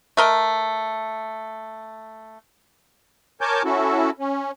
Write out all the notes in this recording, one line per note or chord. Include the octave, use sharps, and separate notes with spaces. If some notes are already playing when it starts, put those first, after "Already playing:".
A3 A#4 D#5
A#4 C#5 G#5 A5 D6 G6
C#4 E4 F#4 A4
C#4